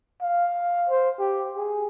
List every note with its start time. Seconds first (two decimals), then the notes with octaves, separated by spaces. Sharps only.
0.22 F5
0.90 C5
1.19 G4
1.56 G#4